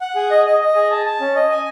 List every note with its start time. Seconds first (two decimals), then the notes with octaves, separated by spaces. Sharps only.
0.01 F#5
0.16 G#4
0.31 D#5
0.46 D#5
0.61 D#5
0.75 G#4
0.91 A5
1.06 A5
1.21 C#4
1.36 D#5
1.51 G#5